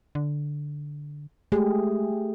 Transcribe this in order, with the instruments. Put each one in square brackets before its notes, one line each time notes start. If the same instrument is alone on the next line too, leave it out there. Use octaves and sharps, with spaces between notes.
[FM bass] D3
[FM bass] G#3 [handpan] A3 G4 G#4